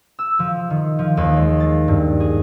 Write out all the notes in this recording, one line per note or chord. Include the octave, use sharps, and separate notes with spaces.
E6
F3
D#3
F3
D#2
G#3
A6
G2
G#4